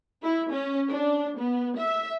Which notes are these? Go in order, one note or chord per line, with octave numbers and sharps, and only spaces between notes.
E4
C#4
D4
B3
E5